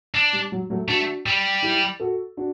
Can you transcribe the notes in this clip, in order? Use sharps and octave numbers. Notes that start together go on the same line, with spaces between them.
D4
G3
F#3
F#3 A3
A3 D4 F#4
G3
E4 G4
F#4 A4
D4 F#4